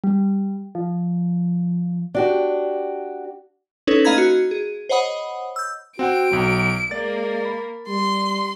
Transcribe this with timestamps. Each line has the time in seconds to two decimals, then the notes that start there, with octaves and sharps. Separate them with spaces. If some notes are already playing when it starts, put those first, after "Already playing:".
0.04 G3
0.75 F3
2.15 D4 F#4 G4
3.87 C#4 D#4 E4 A4 B4 C#5
4.05 A#3 D#5 F5 A#5 B5 G#6
4.18 F#4
4.51 G#4
4.89 C5 C#5 D#5 F#5 B5 D#6
5.56 E6 G6
5.99 C4 F#4 F#5 G5 D7
6.31 B1 F#3
6.91 G#3 A#3 D5 A6
7.45 B5
7.88 G3 C6